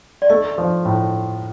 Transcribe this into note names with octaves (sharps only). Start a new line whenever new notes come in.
D5
A3 D#5
F3
A2